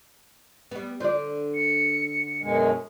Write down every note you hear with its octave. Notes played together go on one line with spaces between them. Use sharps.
G3 B3
D3 C5 D5
C#7
F#2 B2 G#3